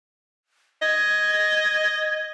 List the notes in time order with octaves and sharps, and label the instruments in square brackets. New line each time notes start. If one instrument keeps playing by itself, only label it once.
[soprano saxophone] D#5 [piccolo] G#6